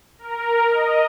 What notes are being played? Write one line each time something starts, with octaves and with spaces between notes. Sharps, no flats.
A#4
D#5